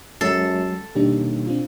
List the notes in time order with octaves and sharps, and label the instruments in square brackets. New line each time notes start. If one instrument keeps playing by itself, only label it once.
[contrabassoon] F#2 [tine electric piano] F#3 G#3 C7 [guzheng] A4
[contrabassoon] D#2 [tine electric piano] B2 [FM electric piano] G3 D4 G4
[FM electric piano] C4 D4 F4